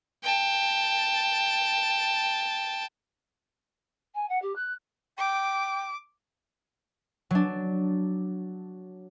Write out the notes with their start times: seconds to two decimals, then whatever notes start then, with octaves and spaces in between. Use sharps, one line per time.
0.23 G5 A5
4.14 G#5
4.29 F#5
4.41 G4
4.55 F#6
5.18 G5 D6
7.31 F#3 D4